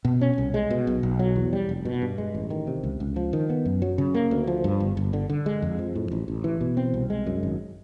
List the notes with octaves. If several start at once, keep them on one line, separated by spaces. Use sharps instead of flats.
B2
C#4
C2
G#3
B2
B1
B1
F#3
E2
G3
F1
B2
G2
G#3
A1
D#3
C3
C#2
C#2
F3
D#3
B3
F#2
F#3
C#3
A#3
D2
F3
G2
G1
G1
D3
D3
G#3
F2
F3
A2
A1
A1
E3
B2
C4
C2
G#3
F#2
G#1